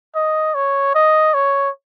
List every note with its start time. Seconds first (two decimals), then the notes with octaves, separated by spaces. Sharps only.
0.15 D#5
0.55 C#5
0.95 D#5
1.34 C#5